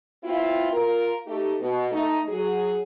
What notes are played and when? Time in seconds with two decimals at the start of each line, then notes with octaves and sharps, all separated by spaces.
0.24 B3 C4 E4 F4
0.73 F4 A#4
1.27 A3 D#4 G4
1.60 B2
1.91 A3 D#4
2.28 F#3 G#4